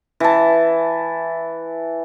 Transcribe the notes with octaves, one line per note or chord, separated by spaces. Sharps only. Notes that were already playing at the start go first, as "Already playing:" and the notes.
E3 A5